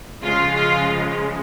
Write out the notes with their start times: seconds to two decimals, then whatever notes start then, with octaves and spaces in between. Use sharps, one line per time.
0.22 C#3 F3 G#3 F4
0.55 F4